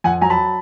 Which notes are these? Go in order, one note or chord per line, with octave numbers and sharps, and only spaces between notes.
F2 F#5 G#5
F#3 G#5 A#5
A5 B5